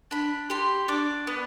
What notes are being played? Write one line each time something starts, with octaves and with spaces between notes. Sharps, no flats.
D4 B5
G4 C6
D4 D6
B3